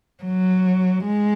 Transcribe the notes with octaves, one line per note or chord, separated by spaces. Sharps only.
F#3
G#3